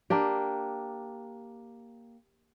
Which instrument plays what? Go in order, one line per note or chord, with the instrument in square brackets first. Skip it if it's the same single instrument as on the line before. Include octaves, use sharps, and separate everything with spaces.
[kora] A#3 D4 G4